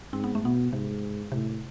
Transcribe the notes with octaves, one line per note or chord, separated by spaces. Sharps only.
G#2 C4
B3
A3
B2 B3
G#2 C3
A2 C3